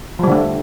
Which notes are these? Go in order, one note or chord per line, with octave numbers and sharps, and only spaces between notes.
D3 F3 G3 A3